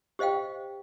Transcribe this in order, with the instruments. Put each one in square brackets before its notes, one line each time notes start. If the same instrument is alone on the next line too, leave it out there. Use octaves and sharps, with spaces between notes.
[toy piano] G4 C5 D#5 F5 G5